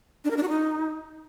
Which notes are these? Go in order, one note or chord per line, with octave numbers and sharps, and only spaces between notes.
D4
A#4
D4
F#4
D#4